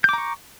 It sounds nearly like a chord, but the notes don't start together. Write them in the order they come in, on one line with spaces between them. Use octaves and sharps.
G6 D6 A#5 C#6